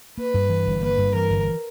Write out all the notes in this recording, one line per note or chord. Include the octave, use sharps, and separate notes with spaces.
A#3 B4
G2
E3
G1
A#3 B4
G2
E3 A#4
G1